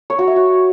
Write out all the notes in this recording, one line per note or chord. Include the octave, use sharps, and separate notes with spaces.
C#5
F#4
E5
F#4